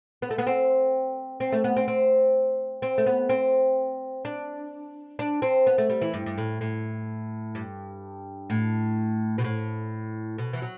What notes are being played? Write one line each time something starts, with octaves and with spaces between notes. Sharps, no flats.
B3
A3
B3
C4
C4
A3
B3
C4
C4
C4
A3
B3
C4
D4
D4
C4
B3
A3
G3
E3
G2
G2
A2
A2
G2
A2
B2
A2
B2
E3
F#3